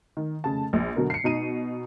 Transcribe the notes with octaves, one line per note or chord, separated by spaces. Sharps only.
D#3
F1 C#3 A5
A#1
B2 D3 F#3 A#4
C7 C#7
B2 D#4 D#7